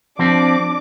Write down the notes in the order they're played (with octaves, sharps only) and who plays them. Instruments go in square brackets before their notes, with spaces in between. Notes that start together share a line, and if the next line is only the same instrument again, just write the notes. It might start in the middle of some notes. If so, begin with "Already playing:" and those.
[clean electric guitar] F3 C4 [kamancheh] D4 D6